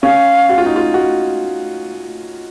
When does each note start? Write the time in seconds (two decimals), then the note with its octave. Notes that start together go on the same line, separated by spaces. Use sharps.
0.03 C#4 F5
0.49 F#4
0.58 F4
0.66 D#4
0.76 F4
0.94 F#4